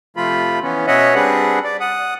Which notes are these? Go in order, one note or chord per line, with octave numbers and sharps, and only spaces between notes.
C3 F3 A3 F4 B5
E3 B3 C#4
B2 C#4 C#5 D#5 E5 F#5
G3 C4 D4 G#4 B4 F#5
D5
F#5 D#6